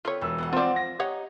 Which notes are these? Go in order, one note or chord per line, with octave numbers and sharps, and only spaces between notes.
D3 C4 F4 B4 C#5
E1 B4 E6
B3 C5 F#5
F3 C4 F4 D5
A#6
D#4 G4 C#5 F#5